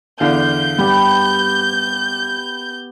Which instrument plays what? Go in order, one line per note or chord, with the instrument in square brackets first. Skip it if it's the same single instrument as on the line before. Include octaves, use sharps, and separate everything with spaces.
[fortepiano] E2 D3 F5 [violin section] G6
[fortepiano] G2 [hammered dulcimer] B3 G4